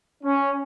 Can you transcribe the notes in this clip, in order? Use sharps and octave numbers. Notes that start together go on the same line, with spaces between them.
C#4